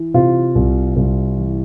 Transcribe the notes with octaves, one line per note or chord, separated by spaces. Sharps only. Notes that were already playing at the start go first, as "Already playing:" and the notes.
Already playing: E3
C3 F4
C2
C2
E3